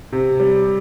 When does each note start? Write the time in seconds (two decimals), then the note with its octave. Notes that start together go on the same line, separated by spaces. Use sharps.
0.13 C3
0.40 G3